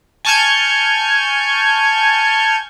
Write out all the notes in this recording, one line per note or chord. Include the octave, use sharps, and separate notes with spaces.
G#5 A5 C#6 F6 G6 G#6